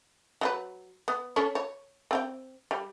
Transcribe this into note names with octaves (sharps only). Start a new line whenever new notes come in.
F#3 F4 B4
B3
C#4 A4 C#5
C#5
C4 F5 G5
G3